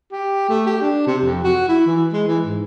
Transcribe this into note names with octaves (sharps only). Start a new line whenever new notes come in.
G4
A3
G4
D4
C3
F2
F#4
E4
E3
G#3
E3
G#2